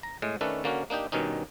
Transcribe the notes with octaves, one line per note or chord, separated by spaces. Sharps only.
A#5
A2 G#3
D#3 A3 C#4 D4 A4 B4
D3 A#3 C#4 F#4
A#3 D4 D#4 G4
G2 B2 D#3 C#4 D#4